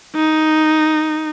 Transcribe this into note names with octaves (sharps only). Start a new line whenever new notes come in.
D#4